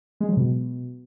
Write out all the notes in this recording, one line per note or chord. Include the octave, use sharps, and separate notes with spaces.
G#3
F#3
B2